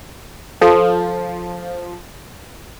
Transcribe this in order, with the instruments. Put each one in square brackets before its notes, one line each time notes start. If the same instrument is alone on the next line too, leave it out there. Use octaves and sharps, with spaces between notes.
[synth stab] F3 [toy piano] A4